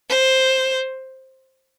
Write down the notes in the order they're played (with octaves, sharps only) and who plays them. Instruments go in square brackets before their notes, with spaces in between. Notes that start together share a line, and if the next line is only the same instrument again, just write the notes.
[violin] C5